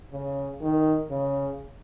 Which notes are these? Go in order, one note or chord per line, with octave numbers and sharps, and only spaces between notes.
C#3
D#3
C#3